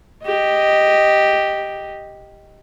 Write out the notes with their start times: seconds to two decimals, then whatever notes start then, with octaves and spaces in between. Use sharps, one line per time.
0.24 G4 D#5